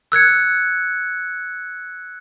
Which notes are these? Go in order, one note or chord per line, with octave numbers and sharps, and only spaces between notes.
E6 F#6 G#6 C#7